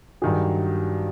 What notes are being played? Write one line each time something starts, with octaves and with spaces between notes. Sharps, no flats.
G2 D#3 F#3 G#4